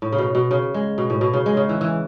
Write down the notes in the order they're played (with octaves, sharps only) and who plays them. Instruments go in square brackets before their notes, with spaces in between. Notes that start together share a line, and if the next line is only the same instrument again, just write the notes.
[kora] A2
C#3
B2
B2
C#3
G#3
B2
A2
B2
C#3
G#3
C#3
E3
E3